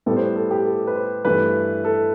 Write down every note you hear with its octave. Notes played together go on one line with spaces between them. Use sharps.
A2 G3 B3 A4
C5
B4
A4
G4
A4
B4
C5
G2 E3 A3 B4
A4